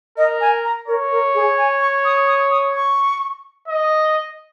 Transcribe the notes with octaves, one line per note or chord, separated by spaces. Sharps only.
A#4 D#5
G#5
A#5
A#4 C#5
A#4
G#4
G#5
C#6
D#6
D#6
D#6
C#6
D#5